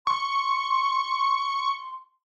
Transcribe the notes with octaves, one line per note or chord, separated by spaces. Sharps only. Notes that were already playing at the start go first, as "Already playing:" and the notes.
C6 C#6